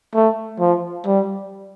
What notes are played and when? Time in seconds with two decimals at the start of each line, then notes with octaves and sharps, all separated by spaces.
0.15 A3
0.60 F3
1.06 G3